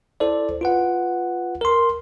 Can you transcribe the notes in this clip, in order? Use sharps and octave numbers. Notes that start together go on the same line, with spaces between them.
E4 A4 C5 D5
F4 B4 F#5
A#4 C6